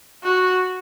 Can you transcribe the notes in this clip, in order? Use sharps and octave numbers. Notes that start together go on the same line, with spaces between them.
F#4